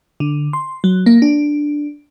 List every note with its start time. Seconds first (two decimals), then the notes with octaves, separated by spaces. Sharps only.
0.20 D3
0.53 C6
0.84 F#3
1.06 A#3
1.22 D4